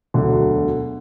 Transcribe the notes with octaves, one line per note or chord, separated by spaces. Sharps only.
E1 D2 D3 F#3